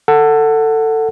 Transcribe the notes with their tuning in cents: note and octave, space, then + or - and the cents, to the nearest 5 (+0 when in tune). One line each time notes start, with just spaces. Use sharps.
A4 +20 F#5 +0